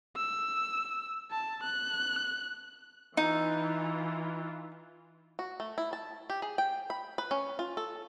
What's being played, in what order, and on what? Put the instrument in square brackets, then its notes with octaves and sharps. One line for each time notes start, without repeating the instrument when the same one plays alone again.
[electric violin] E6
A5
F#6
[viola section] E3 F4 [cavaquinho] D#4
[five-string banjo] F#4
A3
E4
A5
G4
G#4
G5
B5
B4
C#4
F4
A4